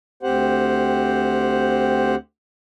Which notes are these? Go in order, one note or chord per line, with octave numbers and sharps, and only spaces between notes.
D2 C4 G4 C5 F#5